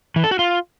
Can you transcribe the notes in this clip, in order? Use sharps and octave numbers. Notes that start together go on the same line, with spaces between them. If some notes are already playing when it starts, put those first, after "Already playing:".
E3
A4
F#4
F4